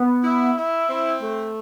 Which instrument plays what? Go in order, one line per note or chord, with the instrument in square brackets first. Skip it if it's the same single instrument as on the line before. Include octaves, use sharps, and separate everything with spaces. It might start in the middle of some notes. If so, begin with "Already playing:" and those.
Already playing: [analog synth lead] B3
[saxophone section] E4
E4
C4
A3